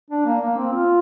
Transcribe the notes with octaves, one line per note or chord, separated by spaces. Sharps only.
D4
A#3
A#3
C4
F4